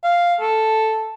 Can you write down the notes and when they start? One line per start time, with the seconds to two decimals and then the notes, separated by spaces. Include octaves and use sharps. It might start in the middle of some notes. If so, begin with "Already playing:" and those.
0.04 F5
0.41 A4